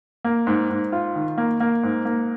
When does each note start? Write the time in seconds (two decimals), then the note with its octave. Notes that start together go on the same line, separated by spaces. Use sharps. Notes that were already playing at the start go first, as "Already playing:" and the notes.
0.24 A#3
0.47 G#2
0.69 G#2
0.92 F4
1.16 D#3
1.38 A#3
1.60 A#3
1.83 G#2
2.05 A#3